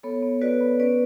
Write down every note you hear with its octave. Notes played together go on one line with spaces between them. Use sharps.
B3 A4 C#5
B3
F#4 B4 D5
B3
C#4 B4 D5